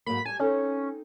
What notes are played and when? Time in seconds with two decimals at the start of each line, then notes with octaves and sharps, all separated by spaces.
0.06 G#2 F#3 A#3 B5
0.25 G3 G4 G#5 A5
0.40 C4 C#4 D#4 A4